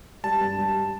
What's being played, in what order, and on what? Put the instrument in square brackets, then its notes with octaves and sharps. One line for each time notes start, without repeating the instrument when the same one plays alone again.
[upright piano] G3 [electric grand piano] A5
[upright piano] G2
G3